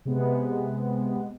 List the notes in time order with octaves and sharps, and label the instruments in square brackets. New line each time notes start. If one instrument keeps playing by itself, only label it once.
[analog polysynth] C3 G#3 B3